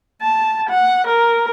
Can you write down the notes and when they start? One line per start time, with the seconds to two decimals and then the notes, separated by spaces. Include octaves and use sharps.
0.22 A5
0.69 F#5
1.07 A#4